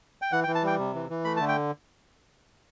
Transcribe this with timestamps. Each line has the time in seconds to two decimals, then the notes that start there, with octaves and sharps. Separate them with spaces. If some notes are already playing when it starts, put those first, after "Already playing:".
0.22 G5
0.32 E3 F#5
0.44 G5
0.48 E3
0.55 A5
0.63 G3 G5
0.78 C3
0.94 E3
1.10 E3
1.25 A3 B5
1.37 A5
1.41 D3
1.48 G5